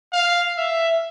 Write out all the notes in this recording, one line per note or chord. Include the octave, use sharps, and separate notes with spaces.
F5
E5